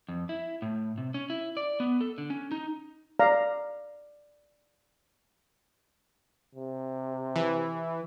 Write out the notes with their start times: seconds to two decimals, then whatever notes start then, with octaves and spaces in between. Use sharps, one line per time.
0.09 F2
0.29 E4
0.62 A2
0.98 C3
1.14 C#4
1.30 E4
1.57 D5
1.80 B3
2.01 A4
2.18 D3
2.30 C#4
2.52 D#4
3.20 D5 F5 A#5
6.55 C3
7.36 E3